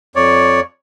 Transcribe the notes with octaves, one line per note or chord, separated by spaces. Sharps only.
F2 C#5 D5